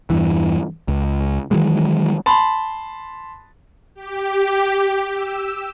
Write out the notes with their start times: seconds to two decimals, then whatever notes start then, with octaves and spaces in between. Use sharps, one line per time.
0.10 E2 G2 E3
0.88 C#2
1.51 D#3 E3 F#3 G#3
2.26 A5 B5 C6
3.95 G4
5.13 E6